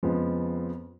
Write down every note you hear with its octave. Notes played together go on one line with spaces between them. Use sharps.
F2 C#3 F3 G#3 B3